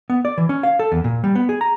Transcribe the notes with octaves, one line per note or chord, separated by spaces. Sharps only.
B3
D5
E3
C#4
F5
A4
E2
A#2
G3
B3
G#4
A#5